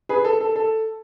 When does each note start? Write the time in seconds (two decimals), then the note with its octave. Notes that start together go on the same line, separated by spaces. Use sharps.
0.09 G#4 B4
0.25 A4
0.41 A4
0.56 A4